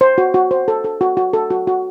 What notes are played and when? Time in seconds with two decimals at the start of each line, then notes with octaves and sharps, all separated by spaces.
0.01 C5
0.18 F#4
0.34 F#4
0.51 C5
0.68 A4
0.84 A4
1.01 F#4
1.17 F#4
1.33 A4
1.50 F#4
1.67 F#4